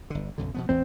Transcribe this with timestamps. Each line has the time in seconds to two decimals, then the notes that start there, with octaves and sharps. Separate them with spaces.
0.10 G1 D3
0.38 B1 F#2 D3
0.54 B2 F3 B3
0.69 A1 E2 E3 C4